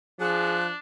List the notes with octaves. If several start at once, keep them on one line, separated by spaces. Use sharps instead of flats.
F3 D4 G#4 F#6